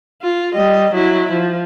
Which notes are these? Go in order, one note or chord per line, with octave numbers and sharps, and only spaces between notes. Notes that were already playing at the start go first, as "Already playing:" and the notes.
F4
G3 D#5
F#3 E4
F3